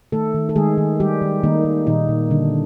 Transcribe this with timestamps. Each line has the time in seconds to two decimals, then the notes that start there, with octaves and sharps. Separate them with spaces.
0.12 D#3 A3 A4
0.35 D#3
0.49 A4
0.56 D#3 G#3 G#4
0.78 D#3
1.00 D#3 G3 G4
1.22 D#3
1.43 D#3 A#3 D#4
1.65 D#3
1.87 A#2 D#3 D#4
2.08 A#2
2.31 D3 G3 D4